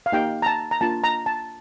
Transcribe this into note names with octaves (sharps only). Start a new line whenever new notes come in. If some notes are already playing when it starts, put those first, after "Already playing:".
F5
A#3 D#4 G4 G5
A#5
A5
A#5
A#3 D4 F4 A5
A#5
A5